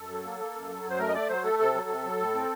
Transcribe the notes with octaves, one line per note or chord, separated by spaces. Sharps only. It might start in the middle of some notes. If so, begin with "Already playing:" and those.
Already playing: F#2 A4
F#3
A#3
A#3
F#2
F#3
F#2
C5
A3 A#4
D#5
A3 D5
F#3 C5
A3 A4
C3 A4
F#3
C3
F#3
A2
C4